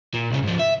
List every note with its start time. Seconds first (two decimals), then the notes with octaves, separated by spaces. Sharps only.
0.14 A#2
0.30 C2 C#3
0.43 G#2 F3
0.59 E5